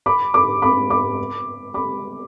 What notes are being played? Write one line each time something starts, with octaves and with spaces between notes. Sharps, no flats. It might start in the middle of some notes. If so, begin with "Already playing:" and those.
B5 D6
B5 D6
B5 D6
B5 D6
B5 D6